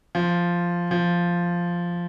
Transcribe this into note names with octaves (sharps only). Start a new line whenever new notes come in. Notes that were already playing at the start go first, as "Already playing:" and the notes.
F3
F3